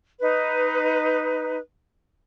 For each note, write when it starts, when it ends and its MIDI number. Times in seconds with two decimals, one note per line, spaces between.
0.20 1.58 63
0.20 1.58 71